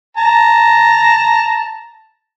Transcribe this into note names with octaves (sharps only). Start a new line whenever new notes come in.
A5 A#5